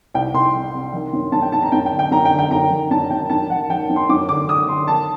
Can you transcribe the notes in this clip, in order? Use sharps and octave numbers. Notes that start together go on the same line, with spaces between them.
C2 G5
C2 C6
C3
C3
D#3
F#2
F#2 A5
G5
F#2 A5
A#5
F#2 G5
G5
D3
G5
F#2 A#5
G5
D3
G5
F#2 A#5
D#3
F#2 A5
F#2 G5
F#2 A5
D#3 F#5
D#3 G5
F#2
C6
F#2 D6
D3 D6
D3 D#6
D3 C6
D#3 A5